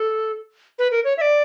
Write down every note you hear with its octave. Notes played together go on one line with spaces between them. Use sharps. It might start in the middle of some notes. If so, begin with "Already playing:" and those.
Already playing: A4
B4
A#4
C#5
E5
D5